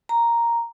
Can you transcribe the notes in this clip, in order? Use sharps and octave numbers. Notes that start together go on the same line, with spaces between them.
A#5